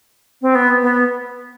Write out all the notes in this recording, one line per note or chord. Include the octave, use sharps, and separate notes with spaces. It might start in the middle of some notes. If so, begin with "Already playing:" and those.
C4
B3
B3